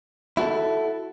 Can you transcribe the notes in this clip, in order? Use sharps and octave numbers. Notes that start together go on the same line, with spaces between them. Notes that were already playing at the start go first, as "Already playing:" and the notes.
E4 F#4 G#4 A4